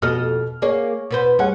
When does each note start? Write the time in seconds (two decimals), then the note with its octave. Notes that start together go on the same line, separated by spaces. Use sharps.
0.02 F2 B2 G4 A4 D#5 F6
0.62 A#3 G#4 C#5 D5
1.10 B2 B4 C5
1.39 G3 C#4 G#4 F#5